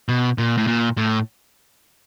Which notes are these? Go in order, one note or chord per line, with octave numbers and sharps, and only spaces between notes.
B2
A#2
A2
A#2
A2